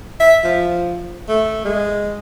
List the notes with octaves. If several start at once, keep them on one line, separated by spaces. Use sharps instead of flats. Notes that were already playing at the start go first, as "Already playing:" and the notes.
E5
F3
A3
G#3